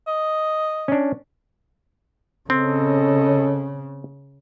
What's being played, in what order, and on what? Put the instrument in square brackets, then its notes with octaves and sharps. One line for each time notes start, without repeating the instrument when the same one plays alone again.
[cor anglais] D#5
[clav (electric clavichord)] C#4 D4
[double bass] C#3 [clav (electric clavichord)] C4 [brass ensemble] C#4 A4 D#5